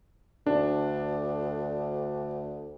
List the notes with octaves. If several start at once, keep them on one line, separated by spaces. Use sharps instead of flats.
D2 D4